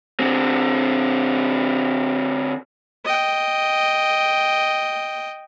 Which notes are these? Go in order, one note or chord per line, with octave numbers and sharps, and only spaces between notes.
D3 C4
D#5 G5